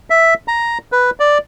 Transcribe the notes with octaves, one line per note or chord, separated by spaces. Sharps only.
E5
A#5
B4
D5